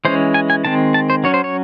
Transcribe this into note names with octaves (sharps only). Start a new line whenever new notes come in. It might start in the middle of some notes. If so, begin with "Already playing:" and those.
E3 G#3 C#4 C5
G#5
G#5
D#3 G#3 C4 A5
A5
C5
F#3 C#4 C#5
C5
C#5